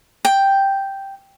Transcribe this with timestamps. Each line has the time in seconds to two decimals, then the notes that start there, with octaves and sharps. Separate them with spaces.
0.25 G5